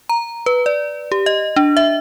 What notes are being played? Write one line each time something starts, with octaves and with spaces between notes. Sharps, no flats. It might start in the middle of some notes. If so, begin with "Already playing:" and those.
A#5
B4
D5
G4
D#5
D4
E5